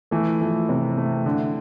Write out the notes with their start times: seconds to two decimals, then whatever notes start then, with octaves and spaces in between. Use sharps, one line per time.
0.11 E3 A3
0.41 F3 A3
0.69 C3
0.97 A3
1.26 D3